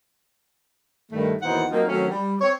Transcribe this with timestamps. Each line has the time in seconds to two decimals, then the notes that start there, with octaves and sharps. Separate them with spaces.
1.12 G2 D#3 A3
1.42 D#2 B2 E3 D#4 C5 F#5
1.71 F3 F#3 A#3 C4 D#4 F4
1.88 D#3 F#3 A3 C4 C#4
2.08 G3
2.41 C4 C#5